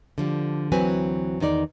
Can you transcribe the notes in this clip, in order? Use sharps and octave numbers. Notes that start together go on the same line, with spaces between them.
D3 F3 G3
D2 E3 F#3 C4 B4 G#5
E2 D#3 D#4 D5